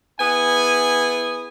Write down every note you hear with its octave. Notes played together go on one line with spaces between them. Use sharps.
B3 E4 G#4 G#5